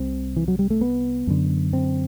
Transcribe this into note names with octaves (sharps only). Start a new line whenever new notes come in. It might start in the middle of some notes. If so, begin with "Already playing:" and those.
Already playing: C2 C3 C4
E3
F#3
G3
A3
B3
F#2 D3
C4